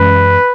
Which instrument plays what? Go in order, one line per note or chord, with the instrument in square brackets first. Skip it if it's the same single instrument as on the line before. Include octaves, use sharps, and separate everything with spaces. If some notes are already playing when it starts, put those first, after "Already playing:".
Already playing: [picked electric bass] F#2 E3 G#3 C#4 [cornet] B4